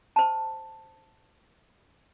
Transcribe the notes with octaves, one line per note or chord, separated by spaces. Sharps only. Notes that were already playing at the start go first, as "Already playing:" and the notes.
C5 A5